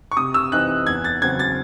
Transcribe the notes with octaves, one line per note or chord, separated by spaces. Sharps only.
C#6
C3 D#6
E6
E3 C4 D#4 F#6
E2 G#6
A6
C#3 F#3 C4 G#6
A6